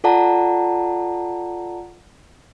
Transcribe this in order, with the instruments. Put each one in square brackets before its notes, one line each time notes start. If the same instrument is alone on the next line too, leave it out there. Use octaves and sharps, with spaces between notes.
[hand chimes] F4 A4 D5 F#5 A5 A#5